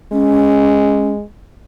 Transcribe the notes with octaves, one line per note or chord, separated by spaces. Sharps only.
G#3 C#4